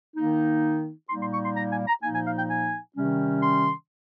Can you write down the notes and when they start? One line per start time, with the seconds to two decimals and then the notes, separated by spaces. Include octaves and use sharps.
0.16 D#3 A#3 D#4
1.09 A#2 G3 A#3 D#4 C6
1.21 C6
1.33 C#6
1.44 C6
1.57 A#5
1.72 G#5
1.87 A#5
2.02 A#2 F3 A#3 D#4 G#5
2.14 G#5
2.26 F5
2.37 G5
2.49 G#5
2.95 C3 D#3 G3 C#4
3.42 C6